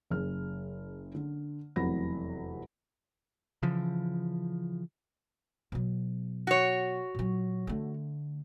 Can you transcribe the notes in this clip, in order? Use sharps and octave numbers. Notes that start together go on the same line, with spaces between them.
F#1 G#4 F6
D3
F1 E2 C3 F#3 B5 A#6
C#3 E3 F3
B2 F#3
F#4 C#5
A#2 F#3
D3 A3